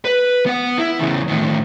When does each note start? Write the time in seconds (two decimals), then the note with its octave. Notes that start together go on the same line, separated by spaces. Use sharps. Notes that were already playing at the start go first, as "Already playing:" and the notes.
0.05 B4
0.46 B3 F#5
0.78 E4
0.99 E2 C#3
1.28 A2 D#3